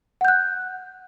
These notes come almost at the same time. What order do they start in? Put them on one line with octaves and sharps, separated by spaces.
F#5 G6 F#6